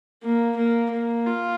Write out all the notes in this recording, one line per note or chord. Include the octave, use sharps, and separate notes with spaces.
A#3
A#3
A#3
F4